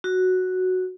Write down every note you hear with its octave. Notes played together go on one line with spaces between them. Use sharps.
F#4